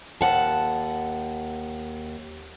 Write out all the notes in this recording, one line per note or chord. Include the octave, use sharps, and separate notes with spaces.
D#2 F#5 A5